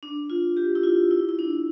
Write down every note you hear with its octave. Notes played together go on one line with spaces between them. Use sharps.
D4
F4
G4
E4
F4
E4
E4
D4